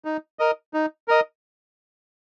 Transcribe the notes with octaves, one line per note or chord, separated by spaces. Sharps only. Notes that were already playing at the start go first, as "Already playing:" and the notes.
D#4
A#4 D#5
D#4
A#4 D#5